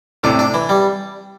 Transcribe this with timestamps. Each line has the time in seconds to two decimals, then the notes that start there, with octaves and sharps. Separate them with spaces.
0.23 A2 C3 D4
0.39 D4
0.54 E3
0.69 G3